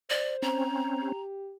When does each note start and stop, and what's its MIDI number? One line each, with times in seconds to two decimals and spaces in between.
0.10 0.66 72
0.10 0.36 74
0.42 1.12 60
0.42 1.12 61
0.42 1.22 82
1.02 1.55 67